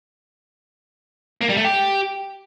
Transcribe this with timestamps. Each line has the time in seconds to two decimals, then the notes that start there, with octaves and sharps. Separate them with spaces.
1.41 A#3
1.49 G3
1.57 A3
1.65 G4